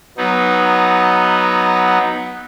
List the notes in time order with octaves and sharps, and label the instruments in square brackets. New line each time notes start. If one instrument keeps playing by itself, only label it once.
[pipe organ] F#3 B3 D#4